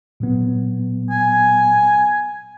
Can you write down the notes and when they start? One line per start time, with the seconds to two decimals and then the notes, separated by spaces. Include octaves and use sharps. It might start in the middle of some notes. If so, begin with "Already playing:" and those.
0.20 A#2 F#3 B3
1.10 G#5